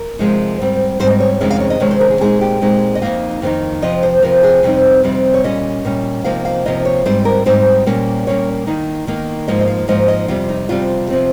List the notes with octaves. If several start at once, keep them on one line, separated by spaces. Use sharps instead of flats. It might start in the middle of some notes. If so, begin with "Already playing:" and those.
Already playing: A#4
C3 F3 G#3 D#4
G#2 G3 C4
G#2 G3 C4 C5
D#5
C#5
F2 C3 D#3 G#3 C#4
F5
C#5
D#5
F2 C3 D#3 G#3 C#4 C#5
C5
A#4
G#4
A#2 G#3 C4 D#4 G#4
G4
A#2 G#3 C4 D#4
D#5
F2 D#3 A#3 D#4 F5
F2 D#3 A#3 D#4
F2 C3 F3 D#5
C5
F2 C3 F3 A#4
G#4
F2 C3 G3 C4 D#4 C5
F2 C3 G3 C4 D#4
C#5
A#2 G3 C#4 D#5
A#2 G3 C#4
C3 F3 A#3 D#4 F5
F5
C3 F3 A#3 D#4 D#5
C#5
G#2 G3 C4 D#4 C5
A#4
G#2 G3 C4 D#4 C5
A#2 G3 A#3 C#4
A#2 G3 A#3 C#4 C#5
D#3 A#3 D#4
D#3 A#3 D#4
G#2 F3 A#3 D#4 D#5
D#5
F5
G#2 F3 A#3 D#4 D#5
D#5
F2 C3 G3 F4
D#4
F2 C3 G3 F4
C3 F3 C4 D#4